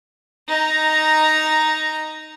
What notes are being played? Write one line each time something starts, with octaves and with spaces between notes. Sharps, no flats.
D#4 A#5